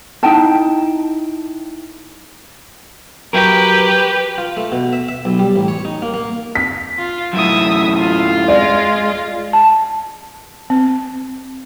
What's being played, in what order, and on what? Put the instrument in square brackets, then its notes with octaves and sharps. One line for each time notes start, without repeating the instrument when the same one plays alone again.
[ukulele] D#4 E4 G5 A5
[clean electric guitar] F#3 A#4 [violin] G4 B4 [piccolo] G5
[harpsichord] F4
A3
B2
E5
E5
B1
G3
A1
C#5
D#4
A#3
A#3
[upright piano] B6
[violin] F4
[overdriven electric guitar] F#2 A2 [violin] E5 D#6
[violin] F4
[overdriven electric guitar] G#3 [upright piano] D5
[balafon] A5
C4